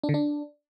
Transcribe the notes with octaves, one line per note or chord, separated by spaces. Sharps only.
D4
D3
D4